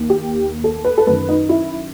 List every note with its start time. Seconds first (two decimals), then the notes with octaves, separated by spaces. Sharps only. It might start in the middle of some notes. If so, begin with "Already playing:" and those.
Already playing: D#2 D#3
0.10 G4
0.64 A4
0.84 B4
0.98 A4
1.07 F#2 D#3 B4
1.28 D#4
1.49 E4